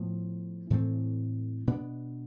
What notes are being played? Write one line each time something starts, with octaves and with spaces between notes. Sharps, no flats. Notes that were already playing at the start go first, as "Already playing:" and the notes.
Already playing: A2 F3 B3
A2 E3 A3 C4
B2 B3 D4